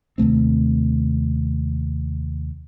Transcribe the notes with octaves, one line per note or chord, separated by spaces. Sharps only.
D#2 C3 A3 C4